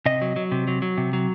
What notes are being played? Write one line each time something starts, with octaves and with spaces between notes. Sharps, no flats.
C3 D#5
F#3
F#3
C3
F#3
F#3
C3
F#3